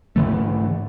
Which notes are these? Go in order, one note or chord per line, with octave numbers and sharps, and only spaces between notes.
G#2 D3 E3 A3